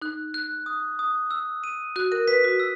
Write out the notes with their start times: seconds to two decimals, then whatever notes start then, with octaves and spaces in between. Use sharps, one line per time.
0.02 D#4 F#6
0.34 F#6
0.66 D#6
0.99 D#6
1.31 E6
1.64 D#7
1.96 F#4 F#6
2.12 A#4
2.28 B4 B6
2.44 F#4
2.60 E6